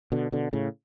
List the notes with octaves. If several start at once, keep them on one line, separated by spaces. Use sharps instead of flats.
B2 D3
B2 D3
A2 C#3